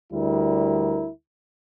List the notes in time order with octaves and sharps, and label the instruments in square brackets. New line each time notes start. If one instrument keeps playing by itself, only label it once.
[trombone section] D2 G3 E4 A#4